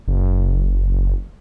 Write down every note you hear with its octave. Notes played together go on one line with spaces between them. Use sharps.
F#1